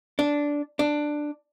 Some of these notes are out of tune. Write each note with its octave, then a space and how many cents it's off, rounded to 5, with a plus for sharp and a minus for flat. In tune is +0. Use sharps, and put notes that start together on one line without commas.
D4 -10
D4 +10